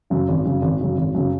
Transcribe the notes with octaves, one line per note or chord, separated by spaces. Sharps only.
F#2 C#3
G#1
F#2 C#3
G#1
F#2 C#3
G#1
F#2 C#3